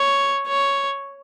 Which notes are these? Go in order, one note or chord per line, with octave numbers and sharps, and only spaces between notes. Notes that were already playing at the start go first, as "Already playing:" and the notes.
Already playing: C#5
C#5